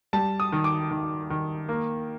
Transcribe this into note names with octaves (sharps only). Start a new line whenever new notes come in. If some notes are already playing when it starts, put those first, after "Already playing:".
G3 A5
D#6
D#3
D6
D#3
D#3
A#3